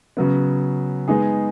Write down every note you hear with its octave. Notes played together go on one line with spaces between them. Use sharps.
C#3 F#3 B3
G#3 B3 D#4 G#4